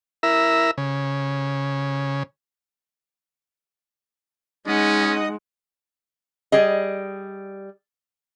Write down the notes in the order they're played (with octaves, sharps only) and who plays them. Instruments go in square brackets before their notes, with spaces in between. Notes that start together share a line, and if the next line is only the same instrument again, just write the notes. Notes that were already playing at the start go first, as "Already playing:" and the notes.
[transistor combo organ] E4 A#4 E5
C#3
[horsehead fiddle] G#3 [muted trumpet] C#4 [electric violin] D#4 F#5 [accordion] D#5 D#6
[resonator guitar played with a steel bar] G3 G#4 D#5